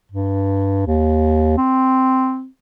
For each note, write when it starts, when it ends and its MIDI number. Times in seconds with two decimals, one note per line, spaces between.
0.12 0.86 43
0.87 1.56 39
1.57 2.47 60